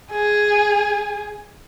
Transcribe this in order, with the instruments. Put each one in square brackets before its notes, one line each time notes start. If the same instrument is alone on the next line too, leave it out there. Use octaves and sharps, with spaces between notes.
[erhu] G#4